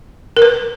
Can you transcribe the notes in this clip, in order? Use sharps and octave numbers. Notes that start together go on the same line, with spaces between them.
A#4
B4